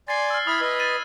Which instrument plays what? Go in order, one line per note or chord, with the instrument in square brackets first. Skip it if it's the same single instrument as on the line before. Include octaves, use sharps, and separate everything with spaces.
[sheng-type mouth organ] D5 G#5 C6 [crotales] A6 C7
[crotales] E6 F6
[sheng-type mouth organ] E4 B5 F6 [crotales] D#6 G#6
[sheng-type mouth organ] B4 D#5
[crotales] A6 D#7